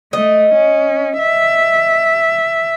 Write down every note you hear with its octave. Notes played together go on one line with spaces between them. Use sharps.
A3 D#5
C#4
E5